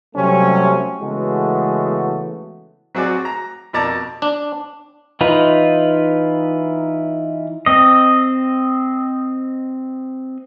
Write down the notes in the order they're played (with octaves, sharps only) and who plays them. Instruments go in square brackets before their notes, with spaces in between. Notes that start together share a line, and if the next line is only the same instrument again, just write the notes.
[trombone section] C3 F#3 G3 A3 C4 C#4
C#3 E3 G#3 A3 B3 F#4
[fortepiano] F#3 C4 F#4 G#4 D5
A#5
F2 B2 A#4 D5 A5 A#5
[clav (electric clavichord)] D4
[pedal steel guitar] E3 D#4 F4 B4
C4 D#5